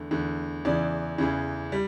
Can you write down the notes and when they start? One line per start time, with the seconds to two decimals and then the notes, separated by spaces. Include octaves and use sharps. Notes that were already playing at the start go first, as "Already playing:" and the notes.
Already playing: E2 D3 A3
0.11 E2 D3 A3
0.65 E2 C#3 E3 D5
1.18 E2 C#3 E3
1.72 G3